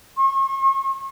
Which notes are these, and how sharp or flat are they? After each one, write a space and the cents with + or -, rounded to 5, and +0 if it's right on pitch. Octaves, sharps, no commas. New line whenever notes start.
C#6 -40